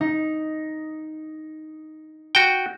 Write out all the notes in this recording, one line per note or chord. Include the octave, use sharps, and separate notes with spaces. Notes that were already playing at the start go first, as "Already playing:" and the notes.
D#4
F#4 G5